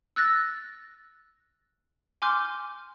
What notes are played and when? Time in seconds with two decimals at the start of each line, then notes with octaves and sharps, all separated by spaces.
0.16 E6 F#6 A6 A#6
2.22 G#5 C6 D6 F6 G6